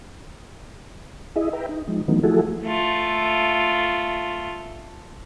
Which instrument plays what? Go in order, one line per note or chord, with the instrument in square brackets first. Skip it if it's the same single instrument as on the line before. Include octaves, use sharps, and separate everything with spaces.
[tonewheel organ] E4 G#4 D#5 E5
B4 E5 G5 A#5
D#4
F3 G#3 D#4
D#3 E3 F#3 A3 B3 D#4
F3 A3 E4 F#4 G#4 A4
[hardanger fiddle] A3 F4